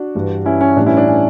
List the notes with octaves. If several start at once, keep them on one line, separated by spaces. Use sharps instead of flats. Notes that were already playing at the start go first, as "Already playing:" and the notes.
Already playing: D4 F#4
G2 E3 G3
C#4 E4
C#4
A2 E3 G3 D4
C#4 E4
D4
C#4